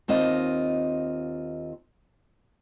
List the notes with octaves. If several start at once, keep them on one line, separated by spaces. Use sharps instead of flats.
D#2 C4 F4 D#5